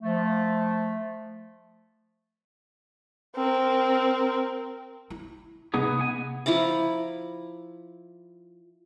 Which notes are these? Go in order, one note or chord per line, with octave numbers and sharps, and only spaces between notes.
F3 A3
C4 A#4
E4
C3 E3 B3 D#4 G#4
B3 G#5
F3 E4 A#5 D6